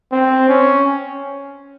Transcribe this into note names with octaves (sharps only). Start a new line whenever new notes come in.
C4
C#4